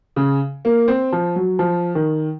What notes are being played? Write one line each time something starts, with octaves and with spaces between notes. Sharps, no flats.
C#3
A#3
C4
F3
F#3
F3
D#3